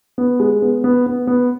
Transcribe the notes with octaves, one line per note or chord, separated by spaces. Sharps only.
B3
G#3
B3
B3
B3
B3